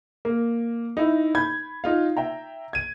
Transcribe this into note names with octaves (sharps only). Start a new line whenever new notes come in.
A#3
D#4 E4 E5
B5 G6 G#6
D#4 F4 F5
E5 G5 A#5
G#6 D#7